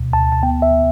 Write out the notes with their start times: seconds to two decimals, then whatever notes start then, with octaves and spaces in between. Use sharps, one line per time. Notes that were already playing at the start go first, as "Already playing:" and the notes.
Already playing: D2 B2
0.13 D2 A5
0.32 A5
0.43 B3 G5
0.62 E5